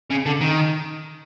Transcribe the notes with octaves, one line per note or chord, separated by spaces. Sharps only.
C#3
D3
D#3